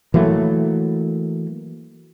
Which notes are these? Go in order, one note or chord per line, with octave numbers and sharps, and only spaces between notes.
E3 F#3 A3 A#3